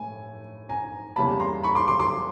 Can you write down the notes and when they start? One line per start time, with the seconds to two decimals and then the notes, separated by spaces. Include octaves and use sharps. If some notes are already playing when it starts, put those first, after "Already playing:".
Already playing: A2 A3 G#5
0.69 G#5 A#5
1.16 E2 C#3 E3 G3 A#3 A5 B5
1.40 A#5 C6
1.63 B5 C#6
1.75 C6 D6
1.88 C6 D6
2.00 C6 D6